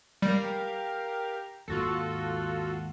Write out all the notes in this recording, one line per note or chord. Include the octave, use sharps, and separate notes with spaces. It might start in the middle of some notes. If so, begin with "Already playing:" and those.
G3 G4 A#4 F5
D#2 G#2 F4 F#4 A4